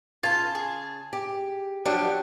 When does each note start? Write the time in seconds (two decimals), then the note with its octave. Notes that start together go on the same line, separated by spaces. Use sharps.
0.23 C#3 F4 G#5 A5
0.55 G#4
1.13 G4
1.85 F3 F#3 D4 G4 F#5